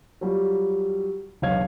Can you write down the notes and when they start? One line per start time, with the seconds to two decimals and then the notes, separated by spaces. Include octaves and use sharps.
0.21 F#3 G3 F4
1.42 E1 B1 C#5 F5 G#6